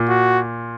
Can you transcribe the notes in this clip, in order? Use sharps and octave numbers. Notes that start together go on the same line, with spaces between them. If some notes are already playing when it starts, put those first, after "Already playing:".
Already playing: A#2
F#4